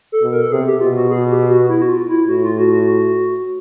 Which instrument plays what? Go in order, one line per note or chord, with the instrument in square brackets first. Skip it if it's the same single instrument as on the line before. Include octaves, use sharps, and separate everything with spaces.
[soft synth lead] A4
[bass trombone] B2
[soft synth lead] A#4
A4
[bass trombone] C3 [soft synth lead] G#4
[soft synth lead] G4
[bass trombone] B2 [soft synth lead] F4
[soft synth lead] F#4
G#4
G4
F#4
E4
F#4
F4
E4
[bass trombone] A2 [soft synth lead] F#4
[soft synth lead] F4
F#4
F#4